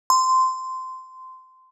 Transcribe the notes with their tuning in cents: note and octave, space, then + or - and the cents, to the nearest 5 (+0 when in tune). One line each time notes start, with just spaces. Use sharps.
C6 -15